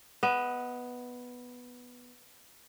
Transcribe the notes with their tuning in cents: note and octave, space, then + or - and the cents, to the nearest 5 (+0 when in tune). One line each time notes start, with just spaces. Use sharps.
B3 +0 D#5 +35